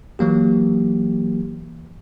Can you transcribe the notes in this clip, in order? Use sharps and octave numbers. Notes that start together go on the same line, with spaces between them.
E3 F#3 A#3 G4